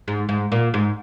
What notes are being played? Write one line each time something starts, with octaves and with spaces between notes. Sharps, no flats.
G#2
G#2
A#2
G#2